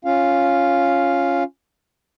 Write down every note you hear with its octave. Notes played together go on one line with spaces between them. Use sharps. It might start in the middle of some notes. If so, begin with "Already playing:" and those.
C#4 F4 F5